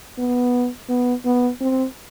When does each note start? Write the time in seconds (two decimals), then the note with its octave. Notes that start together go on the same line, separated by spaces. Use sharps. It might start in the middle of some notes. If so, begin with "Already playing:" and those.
0.18 B3
0.89 B3
1.25 B3
1.61 C4